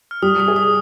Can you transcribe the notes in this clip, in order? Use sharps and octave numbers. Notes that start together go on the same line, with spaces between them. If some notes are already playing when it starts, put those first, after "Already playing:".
F6
G3 D#6
D#6
G#4
D#6